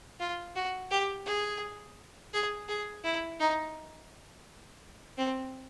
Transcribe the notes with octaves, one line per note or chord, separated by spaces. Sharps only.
F4
F#4
G4
G#4
G#4
G#4
E4
D#4
C4